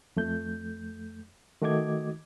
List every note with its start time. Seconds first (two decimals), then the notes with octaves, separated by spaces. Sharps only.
0.16 F2 A3 G6
1.62 D#3 A3 F#4 D#5 D6 G#6